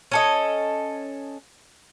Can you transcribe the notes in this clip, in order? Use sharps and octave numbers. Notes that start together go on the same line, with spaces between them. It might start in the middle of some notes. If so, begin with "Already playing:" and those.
C#4 A4 D#5